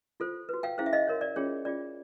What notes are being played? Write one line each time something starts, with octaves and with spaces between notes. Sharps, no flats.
F4 A4 C5
F#4 B4
F5 G5
C#4 E4 G#4 C5 F5
E5
D#5 F5
F#4 A#4 C#5
D5
C#4 F4 G#4 C#5
C#4 F4 G#4 D5